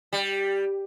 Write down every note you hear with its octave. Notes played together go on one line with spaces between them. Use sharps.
G3